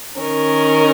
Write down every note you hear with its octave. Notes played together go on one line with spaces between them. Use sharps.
D#3 C#4 A#4